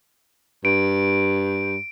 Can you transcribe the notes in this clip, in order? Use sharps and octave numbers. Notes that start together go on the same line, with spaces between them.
G2 D7